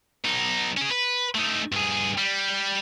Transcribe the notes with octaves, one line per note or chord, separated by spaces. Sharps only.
B1 D#4
C#4 G#4
B4
A3 D#4
G2 G#4
G3